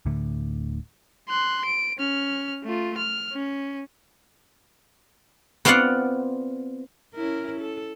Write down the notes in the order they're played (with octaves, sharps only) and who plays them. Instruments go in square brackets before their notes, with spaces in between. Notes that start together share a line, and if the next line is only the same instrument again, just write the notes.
[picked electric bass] D1 A2 D3 A3
[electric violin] C6 F#6
D7
C#4 F6
A3 F4
F6
C#4
[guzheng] B3 C4 F4 D5 F5 F#5
[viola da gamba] C#4 E4 A#4
A4